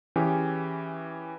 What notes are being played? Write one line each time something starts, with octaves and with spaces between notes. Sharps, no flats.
E3 C#4 G4 G#4